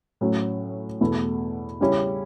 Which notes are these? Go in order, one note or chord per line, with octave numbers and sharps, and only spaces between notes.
A2 F#3 C#4
E2 B2 A3 E4
C#3 G3 C#4 E4